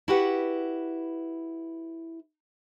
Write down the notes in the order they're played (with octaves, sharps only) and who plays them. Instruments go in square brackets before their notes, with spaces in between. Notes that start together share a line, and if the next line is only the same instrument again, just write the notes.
[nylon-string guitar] E4 F#4 G4 B4 F#5